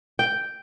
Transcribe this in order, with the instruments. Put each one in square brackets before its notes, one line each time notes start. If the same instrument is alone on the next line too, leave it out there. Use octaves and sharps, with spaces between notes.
[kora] G5